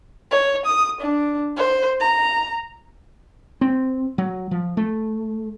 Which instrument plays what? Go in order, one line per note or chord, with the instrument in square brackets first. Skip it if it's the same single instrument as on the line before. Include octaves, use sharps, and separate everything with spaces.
[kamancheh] C#5
D#6
D4
C5
A#5
[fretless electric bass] C4
F#3
F3
A3